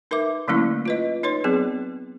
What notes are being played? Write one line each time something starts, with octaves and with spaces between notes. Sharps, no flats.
D#4 A#4 B4 E5 D6
D3 F#3 A3 A#3 C#4 E4
F4 B4 D#5
D#4 B4 C#5 C6
F#3 B3 C4 G#4